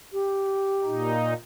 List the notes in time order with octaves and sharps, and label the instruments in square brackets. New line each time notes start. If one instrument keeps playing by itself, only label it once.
[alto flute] G4
[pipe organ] A#2 D#4